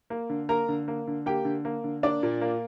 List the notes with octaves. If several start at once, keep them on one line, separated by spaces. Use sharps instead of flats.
A#3
D3
A#3 A#4 A#5
D3
A#3
D3
A#3 G4 G5
D3
A#3
D3
A#3 D4 D5
A#2
A#3